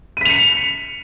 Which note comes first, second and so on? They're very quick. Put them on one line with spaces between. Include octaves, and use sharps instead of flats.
D#7 B6 F7 C#7